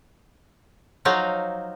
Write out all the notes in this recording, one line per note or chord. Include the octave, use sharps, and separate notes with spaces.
F3 F#3 D#4 F5